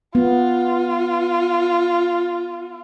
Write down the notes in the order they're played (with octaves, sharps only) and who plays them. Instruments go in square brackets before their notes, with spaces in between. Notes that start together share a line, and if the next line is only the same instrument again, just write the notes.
[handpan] B3 [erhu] F4